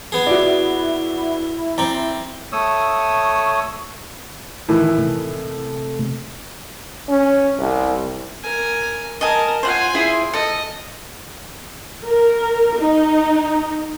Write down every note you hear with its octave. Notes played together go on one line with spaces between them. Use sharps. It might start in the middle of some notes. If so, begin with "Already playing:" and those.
B3 G#4
E4 F#4 D5
C4 D5 A#5
A3 C#5 D#6 E6
A2 D#3 E3
C3 A3
C#4
C2
A#4 G#5
A#4 D#5 G#5 A5
F4 C5 F#5 G#5
E4 G#4 C5
A4 D#5
A#4
D#4